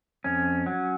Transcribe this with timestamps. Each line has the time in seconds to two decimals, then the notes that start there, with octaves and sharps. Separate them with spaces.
0.24 F2 C#4
0.66 F#3